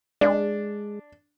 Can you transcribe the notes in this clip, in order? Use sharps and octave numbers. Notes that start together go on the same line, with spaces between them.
G#3 D4